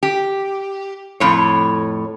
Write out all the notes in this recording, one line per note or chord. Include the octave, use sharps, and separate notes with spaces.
G4
F2 A2 C#5